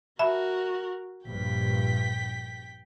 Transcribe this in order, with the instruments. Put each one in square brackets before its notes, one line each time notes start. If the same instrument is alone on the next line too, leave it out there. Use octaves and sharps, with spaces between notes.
[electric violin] F#4 A#4 [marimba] E5 A5 B5
[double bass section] A#1 G2 [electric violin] G5 B6